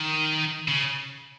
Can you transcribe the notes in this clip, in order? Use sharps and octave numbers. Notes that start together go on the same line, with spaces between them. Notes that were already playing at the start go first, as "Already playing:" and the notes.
Already playing: D#3
C#3